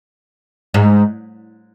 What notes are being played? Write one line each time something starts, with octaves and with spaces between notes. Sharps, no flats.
G#2